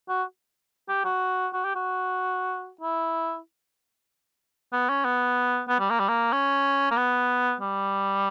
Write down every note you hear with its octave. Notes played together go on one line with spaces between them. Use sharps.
F#4
G4
F#4
F#4
G4
F#4
E4
B3
C#4
B3
B3
G3
A#3
G3
A#3
C#4
A#3
B3
G3